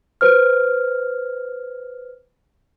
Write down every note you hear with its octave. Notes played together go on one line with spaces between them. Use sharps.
B4 C5 F6